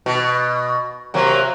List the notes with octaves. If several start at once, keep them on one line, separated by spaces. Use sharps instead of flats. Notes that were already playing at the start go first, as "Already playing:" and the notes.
B2
C3 F#3 A#3